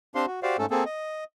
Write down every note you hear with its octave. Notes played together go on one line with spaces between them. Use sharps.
C4 D4 G4 C5 F5 C6
F#4
F#4 G4 C5 D5 F5
G#2 A3 C#4 A4
A#3 C4 G#4 A4
D#5